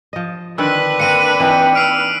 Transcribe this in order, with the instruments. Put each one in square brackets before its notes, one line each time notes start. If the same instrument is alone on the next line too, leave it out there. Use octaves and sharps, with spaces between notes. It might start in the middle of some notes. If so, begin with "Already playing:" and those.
[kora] F3 D#5
[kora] D3 D#3 C4 [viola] D4 B4 [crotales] E6 F#6 B6
[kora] A#3 C4 A#4 [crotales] C#7 D#7
[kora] E3 D#4 [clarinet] C4
[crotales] E6 C7 D7 [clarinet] F6